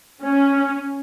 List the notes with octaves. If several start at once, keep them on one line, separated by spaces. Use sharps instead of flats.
C#4